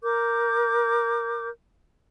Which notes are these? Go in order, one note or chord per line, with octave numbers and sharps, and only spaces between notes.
A#4 D6 G6